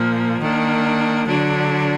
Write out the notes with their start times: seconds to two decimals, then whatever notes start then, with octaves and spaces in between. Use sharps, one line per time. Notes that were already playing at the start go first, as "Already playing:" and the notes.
Already playing: A#2 F3 A#3
0.41 D#3 A#3 D4
1.27 D3 F#3 D4